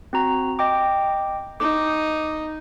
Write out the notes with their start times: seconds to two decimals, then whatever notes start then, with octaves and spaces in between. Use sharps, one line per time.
0.13 C4 F#4 A#5
0.59 D#5 G5 D6
1.60 D#4 D6